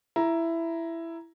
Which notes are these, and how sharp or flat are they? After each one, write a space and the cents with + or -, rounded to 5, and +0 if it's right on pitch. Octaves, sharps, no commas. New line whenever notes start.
E4 +10 A#5 +10